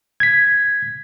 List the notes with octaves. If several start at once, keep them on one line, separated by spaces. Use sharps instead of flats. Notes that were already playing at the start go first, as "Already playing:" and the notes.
G#6 B6